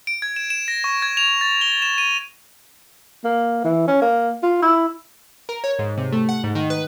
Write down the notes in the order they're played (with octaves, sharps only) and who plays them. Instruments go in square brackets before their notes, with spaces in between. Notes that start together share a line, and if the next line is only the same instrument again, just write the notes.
[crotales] D7
G#6
E7
E7
A#6
C#6
G#6
F7
A6
G7
E7
D#7
[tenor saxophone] A#3
E3
C#4
A#3
F4
E4
[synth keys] A#4
C#5
G#2
C3
A3
F#5
G#2
D#3
B4